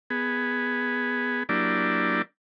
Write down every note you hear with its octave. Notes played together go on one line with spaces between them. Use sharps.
B3 G#4
F#3 A#3 D4 E4 G4 D5